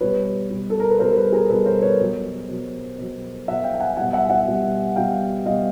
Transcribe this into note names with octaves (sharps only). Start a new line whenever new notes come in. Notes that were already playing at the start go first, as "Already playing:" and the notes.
B2 G3 B4 C#5
B2 G3
A4
A#4
B4
B2 G3 A#4 C5
A4 B4
G#4 A#4
B2 G3 A4 B4
A#4 C5
B4 C#5
B2 F#3
B2 F#3
B2 F#3
B2 F#3 E5 F#5
F5 G5
G5
F#5 G#5
B2 G3 F#5 G#5
E5 F#5
E5 F#5
B2 G3
B2 G3 F5 G5
B2 G3 D#5 F5